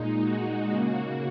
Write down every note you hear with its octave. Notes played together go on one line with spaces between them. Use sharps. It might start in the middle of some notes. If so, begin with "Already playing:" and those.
Already playing: A#2 G#3 D#4
F#4
C#3 A#3